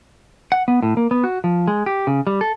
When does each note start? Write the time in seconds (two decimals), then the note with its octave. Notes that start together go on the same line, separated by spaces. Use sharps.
0.52 F#5
0.68 B3
0.83 A2
0.97 A#3
1.11 B3
1.24 F#4
1.44 F3
1.68 G#3
1.86 G4
2.07 C#3
2.27 G3
2.41 A4